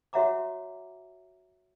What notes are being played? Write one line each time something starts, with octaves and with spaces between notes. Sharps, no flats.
F#4 C#5 E5 F#5 A#5 D6